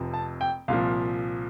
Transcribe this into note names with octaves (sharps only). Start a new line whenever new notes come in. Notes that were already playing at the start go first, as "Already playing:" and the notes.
Already playing: F1 F2 C3 F3
A5
G5
C2 A#2 F3 F5